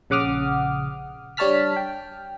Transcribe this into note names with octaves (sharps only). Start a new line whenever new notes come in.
A#1 C#3 F#5 D6 D#6 F6
G3 D4 C#5 A5 F6 B6
G5